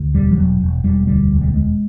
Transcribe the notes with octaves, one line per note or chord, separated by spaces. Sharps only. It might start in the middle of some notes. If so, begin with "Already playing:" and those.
Already playing: D2
E1 G3
F3
E1 F#3
E1
E1 G3
D2 G3
E1
G3
E1 G#3